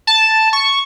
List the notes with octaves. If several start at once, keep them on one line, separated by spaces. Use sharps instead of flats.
A5
C#6